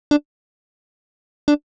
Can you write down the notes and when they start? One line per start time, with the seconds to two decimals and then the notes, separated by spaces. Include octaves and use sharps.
0.11 D4
1.48 D4